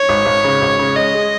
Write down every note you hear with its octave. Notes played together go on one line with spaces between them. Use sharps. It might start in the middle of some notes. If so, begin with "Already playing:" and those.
Already playing: C#5
G#1
G#1
C#3
G#1
C#3
G#3 D#5
G#3